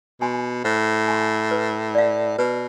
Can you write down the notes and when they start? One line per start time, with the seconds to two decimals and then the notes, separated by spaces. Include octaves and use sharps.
0.21 B2 G#5 C6
0.64 A2 C5
1.08 G#5 C6
1.51 B4
1.95 D5 F5
2.38 B2 B4